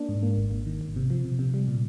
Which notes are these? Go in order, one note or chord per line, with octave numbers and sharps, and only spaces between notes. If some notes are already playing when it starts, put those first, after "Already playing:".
Already playing: A#3 D4
G#2
A#3
G#1
G#1
D#3
G#1
C3
F3
C3
C3
G3
A#2